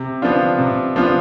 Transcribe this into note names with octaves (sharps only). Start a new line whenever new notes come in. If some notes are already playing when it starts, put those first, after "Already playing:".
Already playing: C3
F3 B3 D4 F4
C3
F3 B3 D4 F4